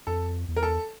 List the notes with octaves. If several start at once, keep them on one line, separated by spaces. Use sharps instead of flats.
F2 A4
E2
A#4
A4